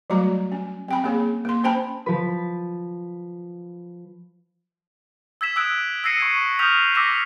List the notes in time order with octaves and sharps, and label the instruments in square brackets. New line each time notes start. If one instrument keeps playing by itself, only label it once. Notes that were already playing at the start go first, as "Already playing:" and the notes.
[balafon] F#3 G3 A3 F#4 A#5
C#4
C4 G5 B5
A#3 C#4 G#4 C#5
A#3 C6
C#4 C5 G5 A5 B5
[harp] F3 B4
[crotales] E6 G#6 B6 E7
D#6 E6 F#6 D7
E6 G#6 A#6 C7 C#7 D#7
C#6 D#7
D#6 F6 G6 B6 F7
D6 E6 A#6 B6 E7